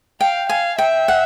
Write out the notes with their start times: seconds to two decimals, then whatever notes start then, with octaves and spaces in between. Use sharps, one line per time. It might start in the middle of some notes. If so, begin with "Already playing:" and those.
0.20 F5 G5
0.49 F5 G#5
0.78 E5 G5
1.08 F#5